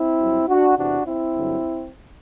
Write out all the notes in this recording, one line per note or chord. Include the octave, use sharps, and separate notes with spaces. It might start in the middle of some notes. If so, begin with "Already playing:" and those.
Already playing: C4 E4
G2 F#3
D4 F#4
E2 C3 E3 D4 F#4
C4 E4
G2 D3 F#3